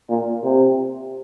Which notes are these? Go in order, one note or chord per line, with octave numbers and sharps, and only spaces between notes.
A#2
C3